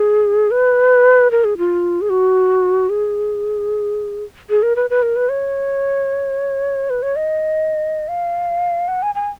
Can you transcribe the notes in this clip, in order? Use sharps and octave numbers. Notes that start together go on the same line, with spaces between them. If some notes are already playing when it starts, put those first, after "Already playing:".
Already playing: G#4
B4
A#4
G#4
F4
G#4
F#4
G#4
G#4
A#4
B4
B4
A#4
B4
C#5
B4
C#5
D#5
F5
F#5
G#5
G#5